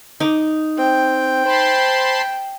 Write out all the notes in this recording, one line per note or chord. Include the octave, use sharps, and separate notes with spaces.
D#4 D6
C4 G5
C5 A5 B5 C6